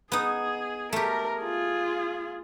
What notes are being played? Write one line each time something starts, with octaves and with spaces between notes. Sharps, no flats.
B3 D#4 G#4
A3 G4 A#4
F4 G#4